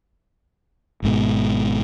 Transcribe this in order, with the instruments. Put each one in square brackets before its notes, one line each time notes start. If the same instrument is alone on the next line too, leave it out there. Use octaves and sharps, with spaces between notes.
[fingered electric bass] G#1 G#2 B2